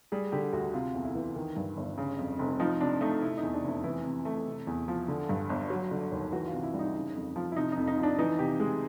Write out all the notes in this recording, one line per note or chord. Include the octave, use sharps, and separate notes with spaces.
G3 G#4
D3 G4
D2 F#4
C3 F4
E2
E4
E3
D#3
G2
G1
C#3
F2
F1
F3 D#4
C3 D4
A3 D#4
C3 E4
D#4
E2
D4
F1
E4
E3 E4
C3
A3
C3
E2
F3
D3
G2
G1
F#3
D3
D#2
E3 F#4
F4
C3
E4
G3
D#4
C#3
F2
F3
E4
C3 D#4
F2 D#4
D#4
F3
D4
E3 D#4
C3 G4
G#3 G#4